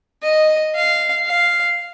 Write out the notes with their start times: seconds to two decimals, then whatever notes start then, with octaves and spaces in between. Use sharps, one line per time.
0.23 D#5
0.75 F5
1.26 F5